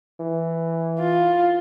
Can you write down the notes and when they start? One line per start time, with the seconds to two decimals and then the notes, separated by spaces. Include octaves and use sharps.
0.20 E3
0.99 F4